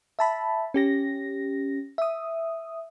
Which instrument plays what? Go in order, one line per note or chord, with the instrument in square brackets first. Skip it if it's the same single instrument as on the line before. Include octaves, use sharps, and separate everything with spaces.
[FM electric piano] E5 A5 B5
C#4 G4 A#6
E5 D#6